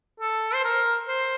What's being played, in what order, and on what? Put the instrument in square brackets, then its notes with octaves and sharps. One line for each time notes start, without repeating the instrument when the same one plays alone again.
[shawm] A4
C5
A#4
C5